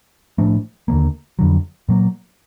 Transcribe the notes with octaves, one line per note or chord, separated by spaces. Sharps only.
A2 F3 A3 D4
D#2 D3 G3 A#3
F2 D3 F#3
A#2 F#3 A#3